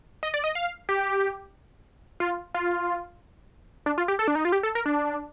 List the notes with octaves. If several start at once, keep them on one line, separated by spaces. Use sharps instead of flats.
D#5
D5
D#5
F5
G4
F4
F4
D4
F4
G4
A4
D4
D#4
F4
G4
A4
A#4
D4